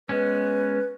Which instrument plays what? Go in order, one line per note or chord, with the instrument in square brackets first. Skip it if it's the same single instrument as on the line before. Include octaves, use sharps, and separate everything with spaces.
[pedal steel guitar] G#3 B3 C#4 [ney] B4